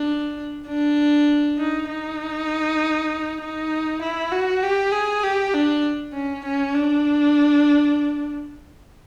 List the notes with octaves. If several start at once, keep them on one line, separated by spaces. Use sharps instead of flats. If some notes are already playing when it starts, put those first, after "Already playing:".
Already playing: D4
D4
D#4
D#4
D#4
E4
F#4
G4
G#4
G4
D4
C#4
C#4
D4